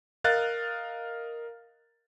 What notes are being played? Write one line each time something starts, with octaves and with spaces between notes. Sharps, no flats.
A#4 D#5 F5 F#6 A6